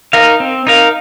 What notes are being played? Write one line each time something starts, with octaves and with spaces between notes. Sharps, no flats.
D#4 A#4 F5
C4
D#4 A#4 F5